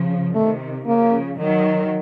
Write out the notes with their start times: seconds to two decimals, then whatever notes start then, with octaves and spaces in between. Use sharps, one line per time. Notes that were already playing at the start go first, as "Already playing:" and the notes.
Already playing: C#3 F3
0.35 C3 D#3 A3
0.87 C#3 F3 A#3
1.38 D#3 F#3